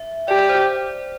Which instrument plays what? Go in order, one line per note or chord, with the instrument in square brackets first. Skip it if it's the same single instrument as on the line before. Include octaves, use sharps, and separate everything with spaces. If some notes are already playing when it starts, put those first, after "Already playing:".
Already playing: [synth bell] E5
[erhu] G4 [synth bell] D5
[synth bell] D5
C5